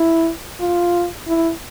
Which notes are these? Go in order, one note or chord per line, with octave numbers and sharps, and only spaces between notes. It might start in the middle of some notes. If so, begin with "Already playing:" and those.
Already playing: E4
F4
E4